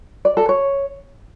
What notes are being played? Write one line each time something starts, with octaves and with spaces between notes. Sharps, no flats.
D5
A4
C#5